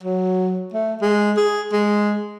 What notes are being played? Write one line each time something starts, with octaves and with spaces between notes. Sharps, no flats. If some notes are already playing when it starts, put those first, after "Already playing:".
F#3
A3
G#3
G#4
G#3